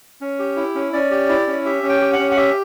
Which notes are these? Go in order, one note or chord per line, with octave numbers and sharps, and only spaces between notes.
C#4
G4
E4
C#4
C#4 D5
G4
E4
C#4
G4 E5
C#4
G5
G4
F#5
C#4
F#5
G4 E5